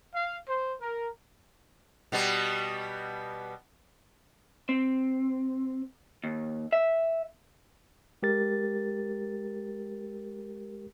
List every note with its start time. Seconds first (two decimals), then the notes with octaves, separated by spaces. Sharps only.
0.14 F5
0.47 C5
0.80 A#4
2.12 B2 G3 B3
4.69 C4
6.24 D#2
6.73 E5
8.23 G#3 G4 A#4 A6